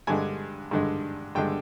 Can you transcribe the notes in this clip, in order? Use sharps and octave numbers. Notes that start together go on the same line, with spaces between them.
G2 D3 G#3 G#5
G2 D3 G#3
G2 D3 G#3 G5